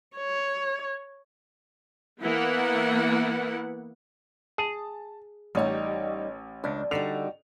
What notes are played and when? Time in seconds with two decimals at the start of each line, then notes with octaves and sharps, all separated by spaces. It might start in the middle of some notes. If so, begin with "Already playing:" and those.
0.16 C#5
2.22 E3 A#3 B3 E4 F#5
4.58 G#4 A5
5.55 A1 G3 D#4 C#5
6.64 C#2 D4
6.91 D3 G3 D#4 F#4 F7